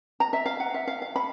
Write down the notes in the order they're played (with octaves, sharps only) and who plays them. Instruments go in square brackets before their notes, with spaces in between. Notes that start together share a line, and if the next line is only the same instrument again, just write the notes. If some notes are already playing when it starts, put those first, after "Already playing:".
[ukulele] A#5
E5
F5
F#5
E5
F5
F5
B5